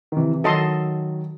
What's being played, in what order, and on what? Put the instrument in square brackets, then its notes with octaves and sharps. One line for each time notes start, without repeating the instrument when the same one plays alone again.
[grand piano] D#3
C3 E3
E3
[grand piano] D#3 F#3 [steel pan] A4 D#5 A5 C6